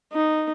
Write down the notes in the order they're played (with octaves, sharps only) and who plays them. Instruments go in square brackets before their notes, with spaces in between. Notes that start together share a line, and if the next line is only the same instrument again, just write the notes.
[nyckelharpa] D#4